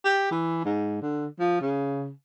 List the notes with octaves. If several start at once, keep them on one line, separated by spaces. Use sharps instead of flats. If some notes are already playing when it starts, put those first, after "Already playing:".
G4
E3
G#2
D3
F3
C#3